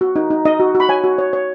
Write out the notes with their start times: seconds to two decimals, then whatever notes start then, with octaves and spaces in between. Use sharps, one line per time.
0.01 F#4
0.16 D#4
0.30 D#4
0.45 D#4 D#5
0.60 F#4
0.75 F#4
0.80 B5
0.89 C#5 G#5
1.04 F#4
1.18 C#5
1.33 C#5